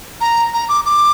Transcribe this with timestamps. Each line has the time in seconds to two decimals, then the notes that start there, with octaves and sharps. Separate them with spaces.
0.21 A#5
0.54 A#5
0.69 D6
0.85 D6